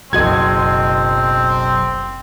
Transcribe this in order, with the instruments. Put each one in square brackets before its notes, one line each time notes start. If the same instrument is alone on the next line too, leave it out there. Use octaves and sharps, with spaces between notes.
[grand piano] F#1 G#6 [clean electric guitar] B1 F#4 D#5 [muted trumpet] C4